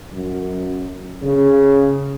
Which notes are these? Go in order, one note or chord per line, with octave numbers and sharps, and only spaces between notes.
F#2
C#3